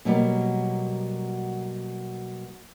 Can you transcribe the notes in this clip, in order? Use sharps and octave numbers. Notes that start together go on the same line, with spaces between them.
B2 F#3 G3 A#3